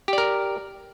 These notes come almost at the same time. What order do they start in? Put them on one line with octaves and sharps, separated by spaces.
G4 D5 A#4